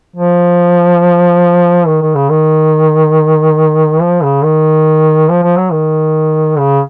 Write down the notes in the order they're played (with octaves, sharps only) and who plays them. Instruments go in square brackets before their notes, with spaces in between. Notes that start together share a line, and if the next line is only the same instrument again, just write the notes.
[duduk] F3
D#3
D#3
C#3
D#3
F3
C#3
D#3
F3
F3
F#3
D#3
C#3